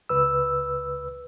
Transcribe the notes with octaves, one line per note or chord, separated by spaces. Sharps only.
C#2 B4 E6